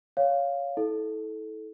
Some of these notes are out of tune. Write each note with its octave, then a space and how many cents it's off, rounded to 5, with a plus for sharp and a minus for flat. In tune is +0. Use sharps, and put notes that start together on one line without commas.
C#5 +10 F5 +0
E4 -30 A4 -15